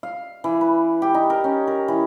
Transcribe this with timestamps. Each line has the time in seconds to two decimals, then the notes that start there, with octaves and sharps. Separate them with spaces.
0.03 F5
0.44 E3
0.61 B4
1.02 G4
1.14 D#4
1.30 A#4
1.44 C#4
1.67 A#4
1.88 E3